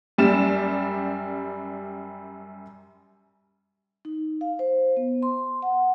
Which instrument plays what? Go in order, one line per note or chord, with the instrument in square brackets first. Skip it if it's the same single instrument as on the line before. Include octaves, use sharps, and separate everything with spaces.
[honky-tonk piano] F#2 G3 D5 E7
[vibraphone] D#4
F5
C5
B3
C6
F#5